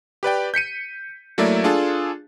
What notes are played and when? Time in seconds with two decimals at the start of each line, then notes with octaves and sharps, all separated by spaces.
0.23 G4 B4 D5 G5
0.54 G6 B6 C#7 D#7
1.38 F#3 A3 A#3 E4 D5 E5
1.64 D4 F4 G#4 A4